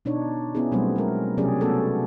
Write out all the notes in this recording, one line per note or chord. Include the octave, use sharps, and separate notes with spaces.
B2 D4 D#4 C#5
B3 C#4 E4 G#4
B2 F#3 G3 A3 C4 C5
G#3 A#4
C3 F#3 C#4 G4 G#4 D5
A3 B3 C#4 F#4 A4